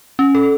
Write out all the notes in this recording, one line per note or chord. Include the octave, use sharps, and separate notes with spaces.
C#4
A4